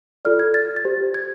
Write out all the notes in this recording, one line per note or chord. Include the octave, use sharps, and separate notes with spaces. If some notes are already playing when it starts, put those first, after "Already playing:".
F4 A4 D5 F6
G#6
A6
A6
G4 C5
G#6